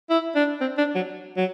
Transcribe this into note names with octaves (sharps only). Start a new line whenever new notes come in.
E4
D4
C4
D4
F#3
F#3